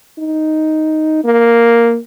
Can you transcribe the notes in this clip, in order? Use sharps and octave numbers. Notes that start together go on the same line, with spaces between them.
D#4
A#3